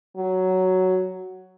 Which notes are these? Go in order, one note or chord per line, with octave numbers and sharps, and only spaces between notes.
F#3